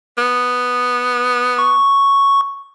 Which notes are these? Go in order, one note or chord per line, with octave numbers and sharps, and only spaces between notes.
B3
C#6